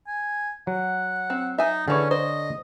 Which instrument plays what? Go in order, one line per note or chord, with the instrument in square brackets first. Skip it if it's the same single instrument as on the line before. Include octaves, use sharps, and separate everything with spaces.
[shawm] G#5
[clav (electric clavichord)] F#3 [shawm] F#5
[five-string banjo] C4
[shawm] D#4 [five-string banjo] E5 G#5
[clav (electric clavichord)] D3 C#5 [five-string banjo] E3 G#4 [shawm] C#4
[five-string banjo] C5 [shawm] D#5